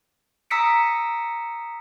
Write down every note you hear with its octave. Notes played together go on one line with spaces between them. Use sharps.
A#5 D#6 E6 B6 C#7 D7